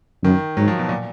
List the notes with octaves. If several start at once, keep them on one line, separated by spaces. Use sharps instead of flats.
F#2 D#3
G#2 F#3
F3
B2
A#2